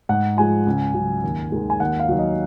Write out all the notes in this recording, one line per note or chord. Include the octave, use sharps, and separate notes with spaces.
G#2 F#5
F3 G#3 G#5
C#2
C#3 F#3
D#2
D#3 G#3
G#5
D#2 F#5
F5
D#3 F#3
D#5